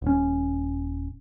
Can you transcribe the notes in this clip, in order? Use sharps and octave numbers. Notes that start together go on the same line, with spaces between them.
D#1 C#4